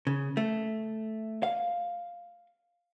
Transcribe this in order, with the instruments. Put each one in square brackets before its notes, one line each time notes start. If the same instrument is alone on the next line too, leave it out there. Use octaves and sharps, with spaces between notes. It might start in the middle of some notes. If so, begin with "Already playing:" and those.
[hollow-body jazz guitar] C#3
A3
F5